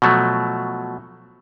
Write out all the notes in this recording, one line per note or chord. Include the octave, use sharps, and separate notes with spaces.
B2 F3 F#3 A3